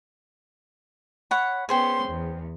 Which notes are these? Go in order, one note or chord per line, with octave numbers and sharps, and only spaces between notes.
C#5 F#5 B5
B3 C#4 G#4 C5 G5 C6
E2